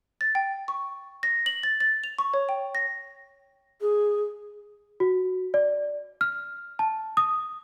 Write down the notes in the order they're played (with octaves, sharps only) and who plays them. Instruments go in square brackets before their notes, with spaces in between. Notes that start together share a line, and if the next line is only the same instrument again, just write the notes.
[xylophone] A6
G5
C#6
A#6
F#7
A6
A6
F7
C#6
C#5
G5
A#6
[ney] G#4
[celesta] F#4
D5
F6
A5
D#6